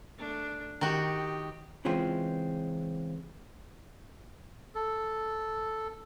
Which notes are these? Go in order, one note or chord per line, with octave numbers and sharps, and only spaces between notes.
A3 D4
D#3 F#4 G4
C#3 E3 G#3 C4 F4
A4